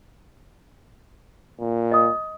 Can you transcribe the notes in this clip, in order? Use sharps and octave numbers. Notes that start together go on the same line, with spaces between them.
A#2
D#5 D#6